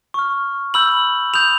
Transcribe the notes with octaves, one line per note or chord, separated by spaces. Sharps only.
C#6 F6
B5 E6 G6 F#7
B5 D#6 G6 F7